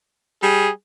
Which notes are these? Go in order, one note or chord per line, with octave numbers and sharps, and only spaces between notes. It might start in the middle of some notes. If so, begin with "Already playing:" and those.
G3 G#4